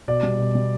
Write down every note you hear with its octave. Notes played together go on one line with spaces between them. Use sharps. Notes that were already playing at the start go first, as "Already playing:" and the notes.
B2 D5
G3
B2
G3